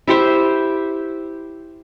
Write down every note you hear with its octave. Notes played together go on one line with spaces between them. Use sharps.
E4 G4 C5 E5